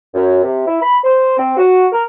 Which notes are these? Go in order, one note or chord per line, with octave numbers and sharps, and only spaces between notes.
F#2
C3
E4
B5
C5
C4
F#4
A#4